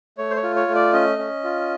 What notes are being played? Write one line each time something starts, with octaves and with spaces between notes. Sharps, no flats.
A3 C#5
C5
C#5
F4
C#5
A3
D5
C#4 D#5
C#4
F4